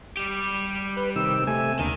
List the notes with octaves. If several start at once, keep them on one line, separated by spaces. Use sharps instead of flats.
G3 G4
B4
C3 D#3 E6
C3 A3 G#5
D#2 D3 D#3